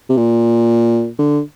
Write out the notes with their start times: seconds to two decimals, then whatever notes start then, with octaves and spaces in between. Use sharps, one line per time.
0.10 C3
0.17 A#2
1.19 D3